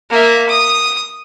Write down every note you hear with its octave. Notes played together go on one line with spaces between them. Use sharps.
A#3 E5
D#6